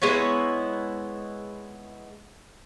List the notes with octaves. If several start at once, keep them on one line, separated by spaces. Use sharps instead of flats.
G#3 B3 E4 C#5